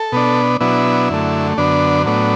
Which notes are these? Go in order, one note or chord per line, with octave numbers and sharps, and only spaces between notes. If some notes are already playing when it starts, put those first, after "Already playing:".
Already playing: A4
B2 B3 D4
B2 F#3 B3 D4 E4
F#2 D3 A3
F#2 D3 B3 D4
A2 F#3 B3 D4